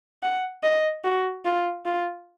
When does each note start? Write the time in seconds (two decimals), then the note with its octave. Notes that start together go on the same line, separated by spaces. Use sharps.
0.23 F#5
0.64 D#5
1.04 F#4
1.45 F4
1.86 F4